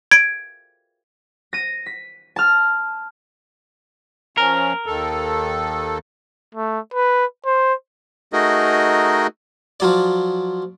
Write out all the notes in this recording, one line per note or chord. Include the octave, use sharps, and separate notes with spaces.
G#6 D7
A#6 D#7
B6
A5 F6
F3 C#4 A#4
D#2 D#3 A4
A3
B4
C5
A3 D#4 F#4 G#4 A#4 D#5
F3 F#3 D5